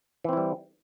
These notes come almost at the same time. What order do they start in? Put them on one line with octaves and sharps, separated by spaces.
E3 C4 E4 G3